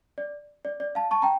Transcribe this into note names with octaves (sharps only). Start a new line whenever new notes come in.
D5
D5
D5
F5 A5
A5 C#6
G5 A#5